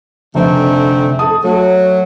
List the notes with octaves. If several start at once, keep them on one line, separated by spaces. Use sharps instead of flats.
F1 D3 A3 C4
A4 A5 D#6
F#3 A3